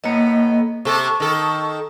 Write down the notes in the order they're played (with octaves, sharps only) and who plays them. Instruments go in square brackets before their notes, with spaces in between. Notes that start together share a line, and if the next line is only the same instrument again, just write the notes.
[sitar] A2 B3 [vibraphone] A#3 D#5
[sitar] C3 A4 [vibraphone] A5 C#6
[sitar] D#3 A4